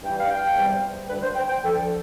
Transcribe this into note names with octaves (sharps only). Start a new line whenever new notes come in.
G2 E3 G3 G5
F5
G5
E2 C3 G3
D2 D3 G3 B4
C5
G5
G5
D2 D3 F3 A4